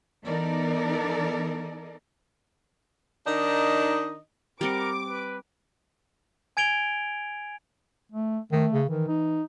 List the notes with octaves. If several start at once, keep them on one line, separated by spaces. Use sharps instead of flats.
E3 B3 D#4 A4 A#4 D5
D#3 D4 D#4 D#5
G3 C4 A#4 F#5 D6
B4
G#5 G#6 D7 F7 G7
A3
D#3 A3
C#3
D#3 E3
D#4